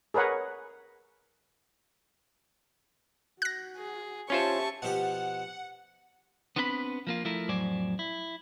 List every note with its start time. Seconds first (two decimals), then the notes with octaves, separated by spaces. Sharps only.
0.14 G#4 A#4 B4 C#5 F#5
3.42 F#4 F#6 A#6
3.77 G#4
4.30 C#4 F4 G4 C5 E5 A5 C#6
4.82 B2 F3 G4 F#5
6.56 B3 C4 D4 B4 G5 B5
7.07 F3 A#3 F4
7.25 F3 A3 E4 A#4
7.48 F2 A2 F#3 C5 D5 G#5
7.99 E4